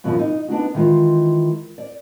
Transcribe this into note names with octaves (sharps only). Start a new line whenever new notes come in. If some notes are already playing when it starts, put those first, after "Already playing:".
F#2 B2 E3 F3
D#4
B3 D4 D#4 F#4
D#3 E3 G#3 F4
D5